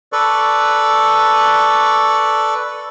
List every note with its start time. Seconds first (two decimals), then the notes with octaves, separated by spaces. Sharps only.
0.13 A4 B4 D5 C#6